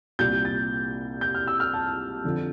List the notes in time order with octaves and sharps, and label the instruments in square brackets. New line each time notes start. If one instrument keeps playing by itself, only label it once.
[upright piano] C2 A#2 G3 G6
A6
G6
F6
E6
F6
A5
F2 D3 F3